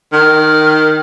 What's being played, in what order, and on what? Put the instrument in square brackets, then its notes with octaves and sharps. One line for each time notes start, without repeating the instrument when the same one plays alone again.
[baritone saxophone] D#3 [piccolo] F6